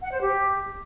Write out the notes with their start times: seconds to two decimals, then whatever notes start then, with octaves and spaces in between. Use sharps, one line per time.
0.02 F#5
0.11 C5
0.21 G4